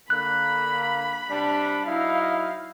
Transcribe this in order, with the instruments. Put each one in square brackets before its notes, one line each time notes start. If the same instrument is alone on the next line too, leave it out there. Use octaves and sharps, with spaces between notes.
[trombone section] D3 A#3 [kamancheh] B5 [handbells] F#6
[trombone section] C3 G3 D4
[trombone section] F#3 D#4 E4 [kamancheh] F5